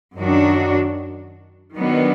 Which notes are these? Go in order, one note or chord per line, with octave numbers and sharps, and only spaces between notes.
F#2 D#3 F#3 D4 F#4
D#3 F#3 B3 D4